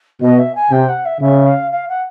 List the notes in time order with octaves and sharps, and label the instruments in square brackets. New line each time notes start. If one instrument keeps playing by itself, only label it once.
[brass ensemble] B2 [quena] D#5
[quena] E5
G#5
[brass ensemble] C3 [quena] G5
[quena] F#5
E5
[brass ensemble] C#3 [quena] E5
[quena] F5
F5
F#5